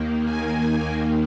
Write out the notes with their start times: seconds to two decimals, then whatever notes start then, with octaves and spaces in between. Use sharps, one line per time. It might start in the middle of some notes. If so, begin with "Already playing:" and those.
Already playing: D#2 D#3 A#3
0.24 G#5